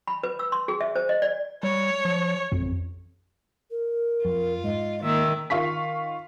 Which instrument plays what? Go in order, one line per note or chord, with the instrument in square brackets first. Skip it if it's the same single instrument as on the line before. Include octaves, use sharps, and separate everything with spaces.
[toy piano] B5
B4
E6
C6
G#4
E5
C5
D#5
D5
[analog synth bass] G3 [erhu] C#5
[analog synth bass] F3
[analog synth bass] A1 [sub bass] F2
[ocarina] A#4
[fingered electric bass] F2 [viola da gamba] F4
[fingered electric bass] G#2 [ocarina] D#5
[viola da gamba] D#3 [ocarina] A#3 [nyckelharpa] E5
[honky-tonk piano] D#3 F4 F5 C#6 B6